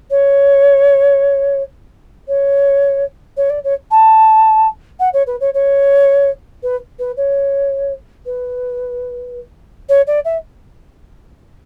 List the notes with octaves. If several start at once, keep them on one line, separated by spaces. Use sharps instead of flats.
C#5
C#5
C#5
D5
C#5
A5
F#5
C#5
B4
C#5
C#5
B4
B4
C#5
B4
C#5
D5
E5